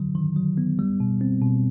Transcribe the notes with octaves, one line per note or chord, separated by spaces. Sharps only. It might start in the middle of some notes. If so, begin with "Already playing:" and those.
Already playing: D3 F#3
D#3
F#3
B3
G3
B2
C4
B2